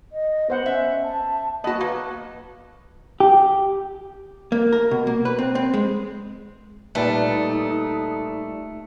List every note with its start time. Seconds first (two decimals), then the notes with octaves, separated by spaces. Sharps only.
0.12 D#5
0.50 B3 C5 F#5
0.66 C#4 E5
1.04 A5
1.64 A#3 B3 F#4 D#5 A5
1.81 A#3 B4
3.20 G4
4.52 A#3
4.72 A#4
4.91 B2
5.07 A#3
5.25 B4
5.39 C4
5.55 C4
5.74 G#3
6.95 A#2 G3 A3 D#4 B4 D5